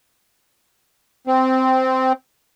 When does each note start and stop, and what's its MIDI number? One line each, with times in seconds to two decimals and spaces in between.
1.27 2.12 60